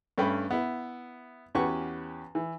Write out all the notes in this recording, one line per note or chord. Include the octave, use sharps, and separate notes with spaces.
G2 A3 C#4 G5 B5
B3 E4
E2 C#4 F#4 G4 B4 C#6
E3